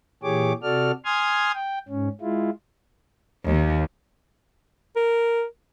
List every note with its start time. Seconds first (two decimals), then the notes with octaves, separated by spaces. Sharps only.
0.23 A#2 E3 G4 G#4 C#5 D6
0.63 C3 F#4 A4 D5 F6
1.05 G#5 C6 D#6 F6 G#6
1.54 G5
1.88 G#2 C#4
2.21 G#3 E4 F4
3.47 D#2
4.96 A#4